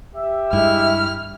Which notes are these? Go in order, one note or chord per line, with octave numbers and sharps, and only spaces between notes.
G4 E5
G2 G#3 E4 F6